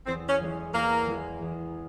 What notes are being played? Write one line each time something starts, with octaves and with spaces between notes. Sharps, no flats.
E2 C4
C#4
E3 G#3 E4
E2 A#3
E3 G#3 E4
E2